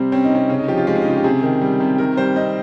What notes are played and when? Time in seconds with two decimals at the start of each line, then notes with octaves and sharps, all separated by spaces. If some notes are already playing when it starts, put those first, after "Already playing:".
Already playing: C3 G3 C4
0.12 C4 C#4
0.24 D#4
0.31 C3 C#4
0.49 C#3 C#4
0.59 D#4
0.68 F3 G4
0.77 F4
0.87 G#3 G4
0.96 C#4
1.02 D#4
1.05 C#3 F4
1.17 G4
1.24 C3 G#4
1.43 D#3
1.62 G3
1.80 C3
1.98 D#3 A#4
2.17 G3 C5
2.36 C4 D#5